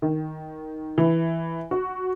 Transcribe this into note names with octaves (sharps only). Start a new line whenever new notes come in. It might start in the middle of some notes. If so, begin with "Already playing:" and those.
D#3
E3
F#4